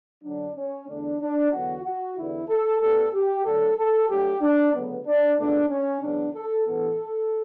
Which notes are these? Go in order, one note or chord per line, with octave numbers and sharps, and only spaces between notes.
F#2 D3 F#3 D4
C#4
E2 D3 A3 D4
D4
E2 D3 F#3 B3 F#4
F#4
E2 D3 G3 B3 E4
A4
A2 G3 B3 A4
G4
D2 D3 F#3 A4
A4
G2 F#3 A3 G4
D4
D2 C#3 F#3 B3
D4
C#2 B2 A3 D4
C#4
E2 C#3 F#3 B3 D4
A4
A1 G2 E3 B3 A4